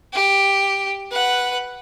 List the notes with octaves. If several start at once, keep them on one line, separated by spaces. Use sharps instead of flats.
G4
B4 F#5